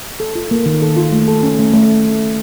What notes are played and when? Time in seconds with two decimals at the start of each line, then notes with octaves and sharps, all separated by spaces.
0.20 A4
0.35 F4
0.51 A#3
0.66 D#3
0.82 A4
0.97 F4
1.12 A3
1.28 A4
1.43 C#4
1.59 A3
1.74 A3